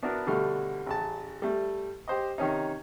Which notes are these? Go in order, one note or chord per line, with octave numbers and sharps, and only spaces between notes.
B3 D4 E4 F#4 A#4
B2 D3 G3 A3 F6
A1 C#3 A5
G3 A3
G4 C5 D#5
C3 D#3 C#4 D#4